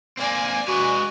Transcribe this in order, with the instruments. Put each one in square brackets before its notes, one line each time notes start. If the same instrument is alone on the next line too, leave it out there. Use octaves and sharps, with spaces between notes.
[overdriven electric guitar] A#3 C4 [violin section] D5 G#5
[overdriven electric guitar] G#3 B4 [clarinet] F#4